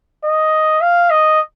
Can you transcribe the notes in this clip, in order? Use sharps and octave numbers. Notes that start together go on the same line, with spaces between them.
D#5
F5
D#5